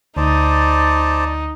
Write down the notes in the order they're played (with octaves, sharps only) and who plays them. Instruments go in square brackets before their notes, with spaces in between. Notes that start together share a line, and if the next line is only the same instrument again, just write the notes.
[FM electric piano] D2 [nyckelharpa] D#4 [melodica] C5 D5 A5